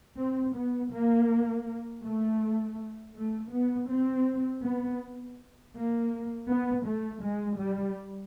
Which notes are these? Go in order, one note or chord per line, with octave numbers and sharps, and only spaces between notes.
C4
B3
A#3
A3
A3
B3
C4
B3
A#3
B3
A3
G#3
G3